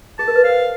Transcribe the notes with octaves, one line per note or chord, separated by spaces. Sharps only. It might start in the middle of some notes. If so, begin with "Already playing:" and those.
G#4 A5
A#4
B4
C5 F5